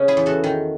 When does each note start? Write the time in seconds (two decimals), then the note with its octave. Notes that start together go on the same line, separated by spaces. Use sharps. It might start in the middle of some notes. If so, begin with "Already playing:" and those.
Already playing: C#3 C#4
0.08 E4 G#4
0.17 E2
0.26 F#4 A4
0.44 D#3